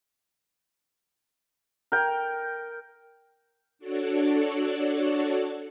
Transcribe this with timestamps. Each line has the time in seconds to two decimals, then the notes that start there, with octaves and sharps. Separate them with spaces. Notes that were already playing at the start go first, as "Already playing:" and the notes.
1.92 A#4 G5
3.79 D4 F#4 A4 C#5 D5